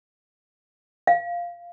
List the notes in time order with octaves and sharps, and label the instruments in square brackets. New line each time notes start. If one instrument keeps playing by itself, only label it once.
[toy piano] F5